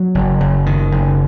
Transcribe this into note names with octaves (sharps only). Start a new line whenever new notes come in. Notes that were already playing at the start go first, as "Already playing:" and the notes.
Already playing: F#3
F#1
F#1
D#3
F#1